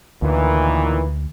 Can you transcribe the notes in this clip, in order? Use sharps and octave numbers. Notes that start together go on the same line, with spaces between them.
D2 A#2 D#3 E3